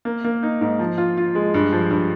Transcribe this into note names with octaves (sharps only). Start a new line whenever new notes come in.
A#3
A#3
D#4
G#2
F3
F4
F4
G#3
G2
F3
G2